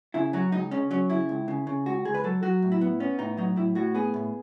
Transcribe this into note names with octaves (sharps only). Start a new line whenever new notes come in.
C#3 E4
F#3 F#4
C#2 D#4
C#3 C#4
F#3 C#4
C#3 E4
C#2
C#3
C#3
C#2 F#4
C#2 G#4
B4
F#3 A4
F#3 F#4
A2
E4
B3
B3 C#4
A2 D#4
F#3 D#4
A2 E4
A2 F#4
B3 G#4
A2